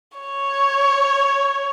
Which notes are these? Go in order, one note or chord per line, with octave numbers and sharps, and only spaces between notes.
C#5